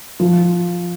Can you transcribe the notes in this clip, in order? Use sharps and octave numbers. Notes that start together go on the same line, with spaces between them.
F3